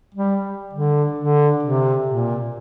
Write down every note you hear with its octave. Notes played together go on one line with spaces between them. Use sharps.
G3
D3
D3
C3
A#2